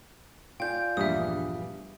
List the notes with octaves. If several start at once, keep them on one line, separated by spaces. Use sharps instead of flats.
F4 D5 G5 G#5 G6
A#1 E2 G2 G3 E5 D#6